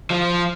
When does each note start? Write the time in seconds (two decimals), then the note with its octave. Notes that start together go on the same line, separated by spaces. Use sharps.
0.10 F3